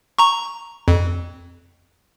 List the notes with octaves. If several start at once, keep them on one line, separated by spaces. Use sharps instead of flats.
A#5 C#6
F2